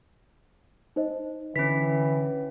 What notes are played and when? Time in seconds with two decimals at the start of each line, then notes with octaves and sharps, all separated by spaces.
0.96 D#4 C5 D#5
1.56 D3 E3 C#4 B4 B6